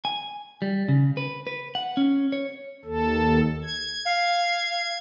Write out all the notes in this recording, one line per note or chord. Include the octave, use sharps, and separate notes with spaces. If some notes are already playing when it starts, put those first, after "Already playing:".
G#5
G3
C#3
B4
B4
F#5
C#4
C#5
D#2 A4
G#6
F5